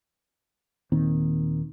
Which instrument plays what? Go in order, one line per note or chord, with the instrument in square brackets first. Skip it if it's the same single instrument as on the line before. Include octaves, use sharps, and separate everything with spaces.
[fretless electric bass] D#2 A#2 D#3 C4